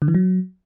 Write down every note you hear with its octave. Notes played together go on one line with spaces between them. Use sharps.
D3
E3
F#3